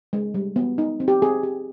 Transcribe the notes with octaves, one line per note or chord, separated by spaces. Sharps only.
G#3
G3
B3
D#4
C4
G4
C4 G#4
G4